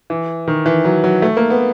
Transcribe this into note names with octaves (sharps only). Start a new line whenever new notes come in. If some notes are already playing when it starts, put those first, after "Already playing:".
E3
D#3
E3
F#3
F#3
A3
A#3
B3